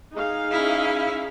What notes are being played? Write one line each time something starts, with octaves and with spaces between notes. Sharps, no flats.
D#4 G#4 F5
C#4 E4